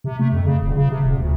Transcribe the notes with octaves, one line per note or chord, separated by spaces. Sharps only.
C3
A3
F2
C#3
D#1
C#3
C3
D#1
D2